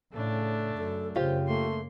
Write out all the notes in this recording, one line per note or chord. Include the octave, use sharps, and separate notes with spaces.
A2 C#3 A3 D4
F#2 A4
F#2 C#3 F4 G4 C5
A3 A#3 C6